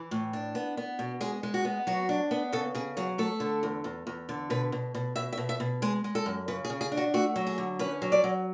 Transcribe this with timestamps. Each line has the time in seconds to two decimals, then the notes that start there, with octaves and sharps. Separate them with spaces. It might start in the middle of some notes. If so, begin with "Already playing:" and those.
Already playing: E3
0.11 A2
0.33 D4
0.55 B3
0.77 B3
0.99 B2
1.21 G#3 G#4
1.43 G#3
1.54 F#4
1.65 B3
1.87 F#3 F#4
2.09 D4
2.31 B3
2.52 C#3 A4
2.75 C#3 G#4
2.97 F#3 G#4
3.18 A3 A4
3.40 D3
3.63 E2
3.84 E2
4.07 E2
4.29 D3
4.50 B2 B4
4.72 B2
4.95 B2
5.16 B2 E5
5.33 E5
5.37 B2
5.49 E5
5.60 B2
5.82 G#3 G#4
6.04 G#3
6.15 A4
6.26 F#2
6.48 C#3 B4
6.65 G#4
6.70 C#3
6.81 G#4
6.92 D4
6.97 F#4
7.14 A3 F#4
7.36 F#3
7.47 G#4
7.58 D3
7.79 C#4 B4
8.02 F#3
8.12 D5
8.24 F#3